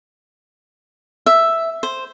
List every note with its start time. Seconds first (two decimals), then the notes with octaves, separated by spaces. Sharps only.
1.26 E5
1.83 C5